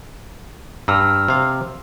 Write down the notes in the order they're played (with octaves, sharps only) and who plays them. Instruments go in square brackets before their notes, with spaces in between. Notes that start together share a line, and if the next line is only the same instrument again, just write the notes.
[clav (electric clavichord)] G2 [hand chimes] A#5 E6 F6
[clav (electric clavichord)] C3 F5